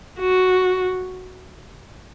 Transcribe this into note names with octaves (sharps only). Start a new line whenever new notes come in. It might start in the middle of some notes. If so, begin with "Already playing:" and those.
F#4